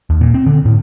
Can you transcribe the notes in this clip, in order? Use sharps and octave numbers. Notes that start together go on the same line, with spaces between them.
D#2
A#2
C4
D3
A2